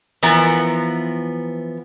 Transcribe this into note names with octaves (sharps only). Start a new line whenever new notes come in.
E3 F3 B3 A#4